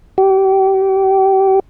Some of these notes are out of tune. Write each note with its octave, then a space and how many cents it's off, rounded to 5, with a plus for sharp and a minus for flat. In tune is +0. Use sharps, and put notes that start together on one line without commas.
G4 -30